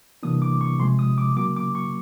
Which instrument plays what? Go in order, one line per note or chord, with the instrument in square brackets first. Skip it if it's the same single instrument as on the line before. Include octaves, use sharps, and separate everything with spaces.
[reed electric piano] C3 E3 G3 A#3 D4 D#6
D6
C#6
C3 F3 G#3 C6
D#6
D6
C#3 F#3 A#3 D6
D6
C#6